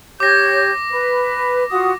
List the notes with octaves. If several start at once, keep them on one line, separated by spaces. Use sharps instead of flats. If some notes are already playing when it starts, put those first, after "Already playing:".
G4 C#5 D6 G6 A#6
B4
F4 F#4 D#6